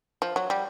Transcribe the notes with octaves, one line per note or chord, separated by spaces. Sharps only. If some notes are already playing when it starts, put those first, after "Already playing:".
F3
F#3
G3